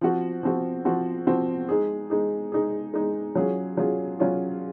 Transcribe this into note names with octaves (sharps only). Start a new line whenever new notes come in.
F3 C4 F#4
F3 C4 F#4
F3 C4 F#4
F3 C4 F#4
G#3 D#4 G#4
G#3 D#4 G#4
G#3 D#4 G#4
G#3 D#4 G#4
F#3 C#4 F4 G#4
F#3 C#4 F4 G#4
F#3 C#4 F4 G#4